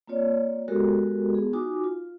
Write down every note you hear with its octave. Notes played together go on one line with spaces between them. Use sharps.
A#3 C4 F4 C#5 D5
G#3 B3 F#4 G4 A4 A#4
B3 G#4
D#4 F4 F#4 G#5 D6
F4